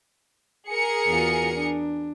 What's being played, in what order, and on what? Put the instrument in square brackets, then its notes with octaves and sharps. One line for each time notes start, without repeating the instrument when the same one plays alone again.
[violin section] G#4 A#4 C#7
[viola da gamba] E2 F4 F#4
D4